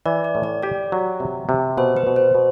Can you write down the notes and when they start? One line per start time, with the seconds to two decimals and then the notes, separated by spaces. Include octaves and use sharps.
0.06 E3 D5
0.24 D5
0.35 A2
0.43 D5
0.63 G4 D5
0.92 F#3
1.20 C3
1.49 C3
1.77 B2 C5
1.96 B4
2.07 B2
2.16 C5
2.35 B2